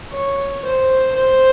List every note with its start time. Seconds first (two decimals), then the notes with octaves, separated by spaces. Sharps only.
0.12 C#5
0.64 C5
1.16 C5